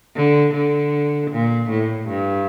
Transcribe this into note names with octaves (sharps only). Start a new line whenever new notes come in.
D3
D3
A#2
A2
G2